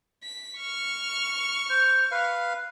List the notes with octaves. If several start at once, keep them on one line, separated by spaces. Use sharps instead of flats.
B6
C#6 F6
C5
B4 F5